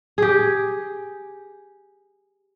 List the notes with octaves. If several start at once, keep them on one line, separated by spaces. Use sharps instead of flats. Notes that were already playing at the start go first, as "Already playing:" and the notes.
G4 G#4